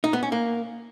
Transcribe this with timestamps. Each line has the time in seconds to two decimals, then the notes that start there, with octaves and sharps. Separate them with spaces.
0.04 D#4
0.13 B3
0.23 C#4
0.32 A#3